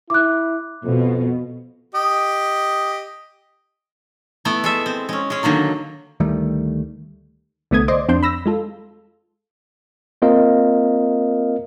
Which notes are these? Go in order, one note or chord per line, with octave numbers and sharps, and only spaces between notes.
E4 D6 F#6
F2 B2
G4 D#5
A3 B3 E4
G#3 A4 E5
C4
G#3 C#4
G#3 C#4
D3 D#3 F#3 A#3
D2 D#3 G3 A3
C2 D3 A3 B3 D#6 G#6
C5 D5 D#5 C6 D6
F2 C4 D4 C6 G6
B5 E6 A#6
G#3 F4 A4
A#3 C4 F4 A#4 D#5 F5